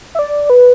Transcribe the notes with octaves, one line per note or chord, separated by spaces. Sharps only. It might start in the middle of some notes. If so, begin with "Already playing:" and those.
E5
D5
B4